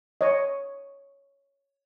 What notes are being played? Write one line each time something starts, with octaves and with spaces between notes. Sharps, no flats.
C#5 D#5